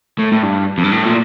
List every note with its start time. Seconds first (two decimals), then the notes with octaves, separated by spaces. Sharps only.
0.18 A2
0.32 A2
0.43 G2
0.78 F2
0.84 G2
0.92 A2
1.06 A#2